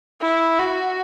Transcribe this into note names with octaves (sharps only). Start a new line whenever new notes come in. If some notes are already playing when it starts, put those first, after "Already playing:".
E4
F#4